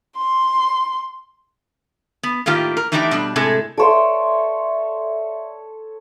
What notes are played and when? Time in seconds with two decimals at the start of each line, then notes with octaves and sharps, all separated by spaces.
0.17 C6
2.23 B3
2.46 A2 D#3 A#3 F4 G4
2.77 A#4
2.92 E3 A3 D4 D#4 F4 G4
3.11 B2 G3 D4
3.36 A2 C3 G#3 A4
3.78 A4 C#5 D5 E5 C6